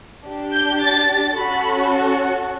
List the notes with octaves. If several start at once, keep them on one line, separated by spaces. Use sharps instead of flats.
D4 G4
G6
A6
C#4 F#4 A4 B5